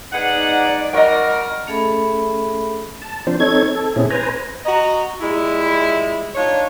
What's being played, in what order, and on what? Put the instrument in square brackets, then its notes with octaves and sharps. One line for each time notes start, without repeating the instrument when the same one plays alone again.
[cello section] D#4 D5 [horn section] G#4 B4 F#5
[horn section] G3 F#4 A#4 [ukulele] D#5 G5
[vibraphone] A3 C#4 G#4 A4 E5 B5
[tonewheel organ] A5
F3 C4 D4 C5
C4 D#4 A4 C#5 G#6
A4
A#2 C4 C#4 E4 G#4
B4 C5 G#5 A#5
[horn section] F#4 D#5 A#5
A#2 G3 G#3 E4
D4 D#4 F4 C#5